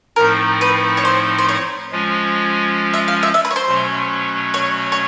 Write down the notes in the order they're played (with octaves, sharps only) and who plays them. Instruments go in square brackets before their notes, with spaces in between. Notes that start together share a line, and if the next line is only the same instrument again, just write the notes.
[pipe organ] A2 F3 A3 C4 D#4 [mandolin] A#4
[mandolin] B4
C#5
C5
C5
C#5
[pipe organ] F3 G#3 C#4 F4
[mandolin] E5
F5
E5
E5
B4
C#5
C5
[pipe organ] B2 F#3 A3 C#4
[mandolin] C#5
C#5